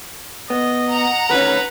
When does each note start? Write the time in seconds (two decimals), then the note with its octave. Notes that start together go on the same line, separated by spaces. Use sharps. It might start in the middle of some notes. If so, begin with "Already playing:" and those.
0.50 B3 D#5
0.91 F#5 A#5
1.30 D2 D#3 C#4 B4